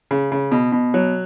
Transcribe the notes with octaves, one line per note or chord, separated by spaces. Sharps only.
C#3
C#3
B2
B2
F#3